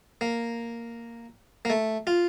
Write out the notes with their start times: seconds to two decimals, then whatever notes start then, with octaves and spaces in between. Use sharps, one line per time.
0.21 A#3
1.65 A#3
1.70 A3
2.07 F4